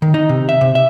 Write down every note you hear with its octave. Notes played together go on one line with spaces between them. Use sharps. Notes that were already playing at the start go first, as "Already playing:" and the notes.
D#3
D#4
C3
E5
C3
E5